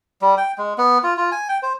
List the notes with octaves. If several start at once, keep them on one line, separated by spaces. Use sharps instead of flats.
G3
G5
G#3
B3
F4
F4
G#5
G5
C5